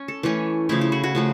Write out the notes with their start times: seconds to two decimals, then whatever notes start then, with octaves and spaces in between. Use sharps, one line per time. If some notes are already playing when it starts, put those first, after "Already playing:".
Already playing: C#4
0.08 A4
0.23 E3 A3 C#4
0.69 C#3 F3 A3 E4
0.81 E4
0.92 F#4
1.04 F#4
1.15 C#3 F3 A3